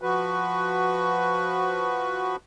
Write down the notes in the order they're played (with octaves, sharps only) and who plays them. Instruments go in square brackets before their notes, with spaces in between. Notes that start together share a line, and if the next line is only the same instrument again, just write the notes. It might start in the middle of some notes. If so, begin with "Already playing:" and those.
[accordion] F3 F#4 B4